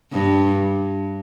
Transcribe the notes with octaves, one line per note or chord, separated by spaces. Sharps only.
G2